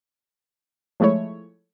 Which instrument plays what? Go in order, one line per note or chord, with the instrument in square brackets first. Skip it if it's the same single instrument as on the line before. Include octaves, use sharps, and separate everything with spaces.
[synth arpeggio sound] F3 G#3 A3 E4 C#5